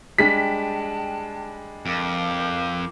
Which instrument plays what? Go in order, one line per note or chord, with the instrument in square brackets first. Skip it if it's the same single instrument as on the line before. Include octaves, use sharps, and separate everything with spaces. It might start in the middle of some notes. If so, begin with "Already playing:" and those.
[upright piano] G3 G#3 D4 [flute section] G5 A5 [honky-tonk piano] B6
[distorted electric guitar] F2 [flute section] A#4 D6